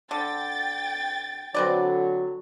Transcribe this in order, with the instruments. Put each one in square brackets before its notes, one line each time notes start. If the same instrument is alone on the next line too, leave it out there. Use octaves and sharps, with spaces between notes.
[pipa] D3 [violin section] G5 A6
[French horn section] D3 F#3 [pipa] C4 B4 D5